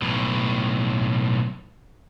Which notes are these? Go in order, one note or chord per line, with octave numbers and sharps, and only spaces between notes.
B1 A2